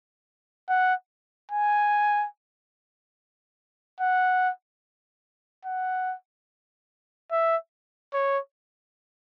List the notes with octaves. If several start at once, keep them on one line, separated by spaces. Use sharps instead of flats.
F#5
G#5
F#5
F#5
E5
C#5